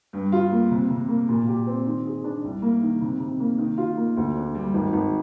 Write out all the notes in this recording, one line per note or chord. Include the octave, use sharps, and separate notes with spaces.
G2
F4
A#3
C3
C3
A#3
A#2
G4
C4
D#3
G#4
D4
C2
A#3
D#3
C3
C3
A#3
D#3
F4
A#3
D2
D4
G3
G#1
G#1